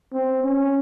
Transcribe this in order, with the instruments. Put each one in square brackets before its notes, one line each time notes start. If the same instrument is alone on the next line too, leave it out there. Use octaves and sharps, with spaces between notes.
[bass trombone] C4
C#4